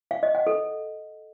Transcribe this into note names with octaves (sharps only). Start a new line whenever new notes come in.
F5
D#5
F#5
A4